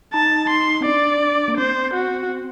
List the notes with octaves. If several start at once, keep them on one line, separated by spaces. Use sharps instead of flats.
D#4 A5
C6
C4
D4 D5
A#3
C4 C5
F#4